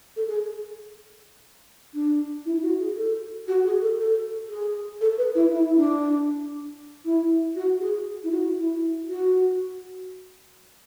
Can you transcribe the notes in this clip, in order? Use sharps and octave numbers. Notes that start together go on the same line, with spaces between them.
A4
G#4
D4
E4
F#4
G#4
A4
F#4
G#4
A4
A4
G#4
A4
B4
E4
E4
D4
E4
F#4
G#4
E4
F#4
E4
F#4